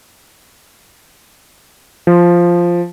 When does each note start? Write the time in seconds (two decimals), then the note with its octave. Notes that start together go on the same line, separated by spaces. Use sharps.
2.07 F3